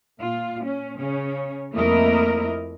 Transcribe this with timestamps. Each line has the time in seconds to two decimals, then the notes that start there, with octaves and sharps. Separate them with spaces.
0.20 A#2 F4
0.64 C#4
0.97 C#3 C#4 C#5
1.74 F2 A3 A#3 E4 A#4 D#5